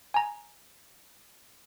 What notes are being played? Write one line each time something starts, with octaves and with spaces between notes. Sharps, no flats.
G#5 A#5